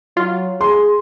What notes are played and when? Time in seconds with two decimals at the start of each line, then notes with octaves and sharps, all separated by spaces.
0.17 F#3 F4
0.61 G#4 C6